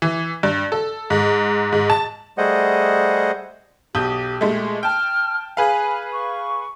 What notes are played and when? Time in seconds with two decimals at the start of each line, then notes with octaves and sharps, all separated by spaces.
0.02 E3
0.43 G2
0.72 A4
1.10 G#2
1.72 G#2
1.90 A5
2.38 G3 A3 G#4 C5 D#5 F#5
3.95 B1 G4 D#6 G6
4.41 A#2 G#3 A3
4.83 G5 A5 F6
5.57 G#4 B4 F5 G#5
6.13 C#6